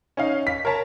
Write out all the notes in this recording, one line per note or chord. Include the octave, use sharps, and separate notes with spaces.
C#4 D#4 F5
B6
A#4 C#5 A5